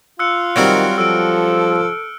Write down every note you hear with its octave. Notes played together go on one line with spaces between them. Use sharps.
F4 E6 F#6 C#7
D#3 F#3 G3 C4 E6 F6 D7
F3 A4 E6 D7